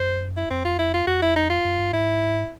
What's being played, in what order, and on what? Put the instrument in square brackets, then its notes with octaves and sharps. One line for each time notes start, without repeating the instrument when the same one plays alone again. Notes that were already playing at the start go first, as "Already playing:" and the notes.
Already playing: [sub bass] F#2 [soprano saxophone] C5
[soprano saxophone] E4
[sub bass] F2 [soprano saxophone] C4
[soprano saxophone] F4
E4
F4
[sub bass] F2 [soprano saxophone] F#4
[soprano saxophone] E4
D#4
F4
[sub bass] F#2
G2
[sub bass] G#2 [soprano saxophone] E4